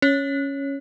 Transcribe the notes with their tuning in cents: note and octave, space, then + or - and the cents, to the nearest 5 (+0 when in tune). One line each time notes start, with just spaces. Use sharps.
C#4 +0 C#5 +0